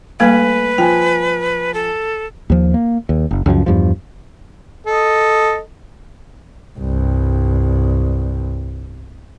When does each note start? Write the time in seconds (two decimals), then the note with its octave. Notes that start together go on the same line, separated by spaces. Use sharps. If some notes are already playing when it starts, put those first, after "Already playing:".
0.20 G3 A3 A#3 B4 F5 G#5
0.78 F3 G5 G#5
1.74 A4
2.50 D#2 F3
2.74 A#3
3.09 D#2
3.31 F#1
3.46 C#2 F#2 E3 F3
3.66 E2 G2 F3
4.86 A4 D#5
6.78 C2 G2